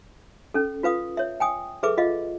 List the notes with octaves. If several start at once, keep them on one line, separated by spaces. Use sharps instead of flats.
C#4 A4
F4 B4 F5 D#6
C#5 E5
G5 G#5 D#6
G#4 A4 B4 E5 D6
F4 D#5 F5